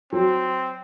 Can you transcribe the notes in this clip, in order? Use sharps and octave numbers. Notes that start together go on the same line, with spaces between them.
F#3 C4